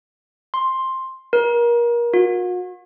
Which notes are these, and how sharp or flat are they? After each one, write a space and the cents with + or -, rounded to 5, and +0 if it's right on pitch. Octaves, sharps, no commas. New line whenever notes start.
C6 +10
A#4 +30
F#4 -45